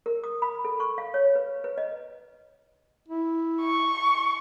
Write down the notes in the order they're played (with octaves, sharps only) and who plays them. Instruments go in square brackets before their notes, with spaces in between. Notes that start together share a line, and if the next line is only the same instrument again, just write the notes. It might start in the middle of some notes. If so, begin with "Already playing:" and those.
[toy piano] A#4
D#6
B5
A4
C#6
F5
C#5
B4
B4
D#5
[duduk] E4
[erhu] C#6